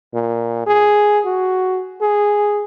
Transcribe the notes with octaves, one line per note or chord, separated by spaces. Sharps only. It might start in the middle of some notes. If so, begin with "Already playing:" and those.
A#2
G#4
F#4
G#4